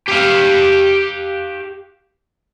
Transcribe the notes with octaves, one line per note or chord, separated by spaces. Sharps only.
G4 F5